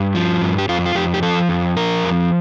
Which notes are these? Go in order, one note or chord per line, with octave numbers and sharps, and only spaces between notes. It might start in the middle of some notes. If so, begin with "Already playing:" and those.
Already playing: G2
F3
G2
G4
F2 F4
F4
F2 G4
G4
F3 A4
F2
F3 A#4
F2